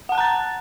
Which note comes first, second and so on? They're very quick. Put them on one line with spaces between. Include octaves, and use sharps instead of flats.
F#5 A5 F#6 A#5 A6